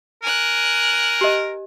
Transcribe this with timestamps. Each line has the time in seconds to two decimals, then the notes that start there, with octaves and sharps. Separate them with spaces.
0.23 A#4 G#5 F#6
1.21 G4 D#5